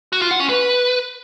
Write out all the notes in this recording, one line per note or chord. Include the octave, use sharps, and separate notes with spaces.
F#4
F4
F#5
C#4
B4